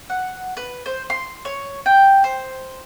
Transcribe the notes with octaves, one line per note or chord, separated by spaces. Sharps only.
F#5
B4
C5
C6
C#5
G5
C5